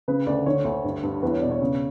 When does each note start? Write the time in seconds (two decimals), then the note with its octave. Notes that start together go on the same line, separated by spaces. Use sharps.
0.08 C#3 B4
0.27 D2 D5
0.46 D3 C#5
0.65 D2
0.84 G2
1.03 G2
1.22 E2 B4
1.32 C#5
1.42 B2 D5
1.51 C#5
1.61 C#3